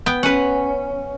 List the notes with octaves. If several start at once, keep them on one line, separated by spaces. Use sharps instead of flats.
B3 G5
C#4 B4 F#5